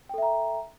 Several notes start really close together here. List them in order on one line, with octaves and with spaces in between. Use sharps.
G5 A4 E5 A#5